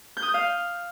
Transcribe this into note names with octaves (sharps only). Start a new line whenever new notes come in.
G6
D#6
G6
F5